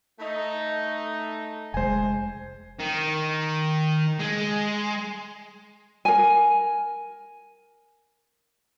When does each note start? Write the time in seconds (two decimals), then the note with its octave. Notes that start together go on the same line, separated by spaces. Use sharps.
0.20 A3 D#4
1.74 F1 G#3 C5 G#5
2.79 D#3
4.19 G#3
6.05 A#4 G#5